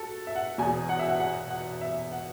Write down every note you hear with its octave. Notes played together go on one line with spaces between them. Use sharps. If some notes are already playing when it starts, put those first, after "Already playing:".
Already playing: F#4 A4
E5
F#5
E1 E2 B2 G#5
F#5
E5
F#5
F#5
F#5
E5
F#5